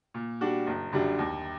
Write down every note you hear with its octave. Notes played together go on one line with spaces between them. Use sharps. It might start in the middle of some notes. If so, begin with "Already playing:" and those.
A#2
G3 D4 F#4
F#1
F#2 D3 G3 D4
D#2